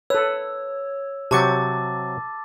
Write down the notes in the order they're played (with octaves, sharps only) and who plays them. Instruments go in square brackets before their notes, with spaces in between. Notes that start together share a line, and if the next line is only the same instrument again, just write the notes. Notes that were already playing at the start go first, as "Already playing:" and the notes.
[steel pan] A4 B4 [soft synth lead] C#5 [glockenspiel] E6
[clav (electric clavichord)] C3 F#3 [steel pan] G4 C#6 [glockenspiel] A5 D6 A6